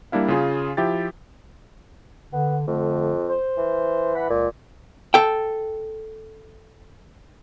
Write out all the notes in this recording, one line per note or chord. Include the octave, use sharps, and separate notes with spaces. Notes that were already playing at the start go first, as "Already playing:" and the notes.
G3 A#3 D4 E4 F5
C#3 F4 G#4
F3 E4 G4 E5 G5 A6
D3 B3
F2 D3 A3
C5
E3
F#5 B5
C#2 A#2
A4 G5